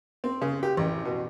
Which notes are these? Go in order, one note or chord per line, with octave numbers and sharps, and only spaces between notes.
C4
C#3
G4
A1
B2